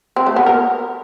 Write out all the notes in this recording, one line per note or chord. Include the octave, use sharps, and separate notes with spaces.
C4
A3
B3
A#4